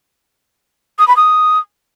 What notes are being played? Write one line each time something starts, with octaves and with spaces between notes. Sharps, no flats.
D#6
B5
D#6